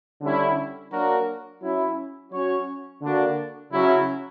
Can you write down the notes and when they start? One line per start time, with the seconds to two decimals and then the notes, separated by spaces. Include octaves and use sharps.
0.21 D3 G3 C#4 E4
0.91 F#3 A#3 D4 F#4 A#4
1.61 F#3 C#4 E4
2.31 F#3 C#4 F#4 C#5
3.01 D3 A#3 D4 F#4
3.71 C#3 F#3 C#4 E4